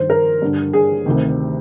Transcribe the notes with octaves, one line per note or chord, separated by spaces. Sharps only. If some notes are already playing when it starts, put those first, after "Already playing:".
Already playing: G2 D#3 C5
A#4
G2 D3
G#4
D2 C3 D#3